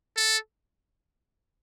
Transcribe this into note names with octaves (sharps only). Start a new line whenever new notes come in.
A4